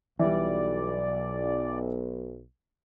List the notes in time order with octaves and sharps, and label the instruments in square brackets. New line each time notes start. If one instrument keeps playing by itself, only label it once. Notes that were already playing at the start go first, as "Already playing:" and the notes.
[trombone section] B1 [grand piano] E3 G3 [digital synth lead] D5